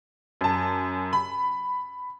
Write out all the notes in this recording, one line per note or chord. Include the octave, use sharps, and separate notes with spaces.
F#2 A5
B5